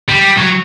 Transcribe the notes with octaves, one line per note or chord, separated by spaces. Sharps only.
G3
F#3